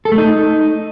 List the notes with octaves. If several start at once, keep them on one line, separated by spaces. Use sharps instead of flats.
A4
A3
D#4